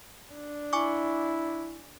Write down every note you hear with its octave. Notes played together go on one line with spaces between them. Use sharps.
D4
E4 G#5 C#6 D6